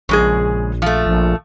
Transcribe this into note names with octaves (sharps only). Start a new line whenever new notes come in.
A#1 C#3 G#3 G#4
F3 A3
A#1